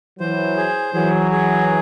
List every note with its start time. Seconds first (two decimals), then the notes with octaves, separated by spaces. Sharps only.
0.19 E3 F#3 C5
0.57 G#4
0.94 E3 F#3 G#4
1.31 G#4